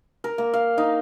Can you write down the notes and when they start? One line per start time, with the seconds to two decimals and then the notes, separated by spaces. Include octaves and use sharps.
0.24 A#4
0.38 A#3
0.53 F5
0.78 D#4